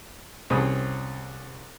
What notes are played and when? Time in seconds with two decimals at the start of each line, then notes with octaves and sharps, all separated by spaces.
0.50 C2 C4 C#4 G#4 D#6